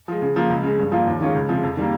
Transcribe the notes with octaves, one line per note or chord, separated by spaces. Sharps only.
F3 G#3
C#3
F3 A#3
C#2
C#3 G#3
G2
F3 A#3 F4
D#2
D#3 G#3 C#4 F4
C#2
C3 F3 G#3
F2
D#3 G3 A#3